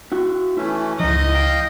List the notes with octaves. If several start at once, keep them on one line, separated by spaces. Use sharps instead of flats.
E4 F#4
E3 A3 C#4 E4
C#2 G#2 F3 D#4 D#5
F5 G5 G6